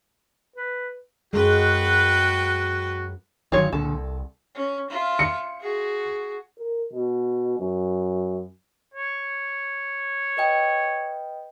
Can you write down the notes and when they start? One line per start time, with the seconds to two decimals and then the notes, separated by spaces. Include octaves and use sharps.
0.56 B4
1.33 F#2 G#3 F4 F#4 B4 G5
3.52 G1 D#3 F#3 F4 C#5
3.72 C#2 A#2 D3 A4
3.94 C2
4.55 C#4
4.90 F4 E5
5.19 C#7
5.61 F#4 G#4
6.59 A#4
6.93 B2
7.59 F#2
8.94 C#5
10.37 B4 D#5 G5